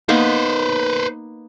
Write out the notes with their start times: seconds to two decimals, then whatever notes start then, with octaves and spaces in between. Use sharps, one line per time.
0.09 A#3 B3 D#4 B4 C5